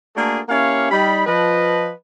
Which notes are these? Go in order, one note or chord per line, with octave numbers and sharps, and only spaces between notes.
A3 A#3 D4 F#4 G#4 A4
A#3 C#4 E4 G4 C#5 F5
G3 D#4 B5
F3 B4 D#5